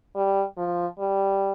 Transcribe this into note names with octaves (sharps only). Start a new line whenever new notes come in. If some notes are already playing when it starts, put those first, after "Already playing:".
G3
F3
G3